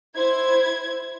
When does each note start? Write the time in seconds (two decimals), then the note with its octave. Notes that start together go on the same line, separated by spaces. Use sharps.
0.16 E4 C5 G#6